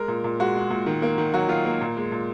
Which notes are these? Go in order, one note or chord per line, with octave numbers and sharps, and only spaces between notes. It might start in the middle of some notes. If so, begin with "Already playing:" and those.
Already playing: G#3 A#4
A#2
A#2
G#3 F#4
G#3
A#2
D#3
A#3
D#3
F#3 F#4
D#3 F4
A#3
A#2
G#3
A#2